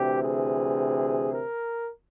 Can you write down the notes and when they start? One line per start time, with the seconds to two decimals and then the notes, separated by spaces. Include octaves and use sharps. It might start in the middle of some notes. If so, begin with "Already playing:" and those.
Already playing: D2 C3 E3 G4
0.22 G#4
1.32 A#4